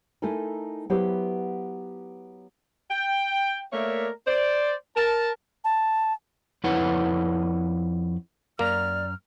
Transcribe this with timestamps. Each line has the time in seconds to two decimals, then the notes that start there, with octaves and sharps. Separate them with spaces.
0.22 A3 D#4 E4 A4 A#4 G#5
0.90 F#3 B3 E4 G4 B4 C5
2.91 G5
3.73 A3 A#3 A#4 C#5 D5 E5
4.27 C5 D5
4.97 A#4 A5
5.64 A5
6.64 F2 E4 B4 C#5 F#5
8.59 F#2 A#3 D5 A#5 F6